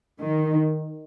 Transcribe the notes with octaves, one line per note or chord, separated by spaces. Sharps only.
D#3